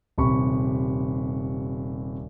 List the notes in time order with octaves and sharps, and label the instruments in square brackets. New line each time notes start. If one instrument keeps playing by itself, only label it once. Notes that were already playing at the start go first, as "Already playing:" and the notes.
[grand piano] D#1 C3 B5 C#6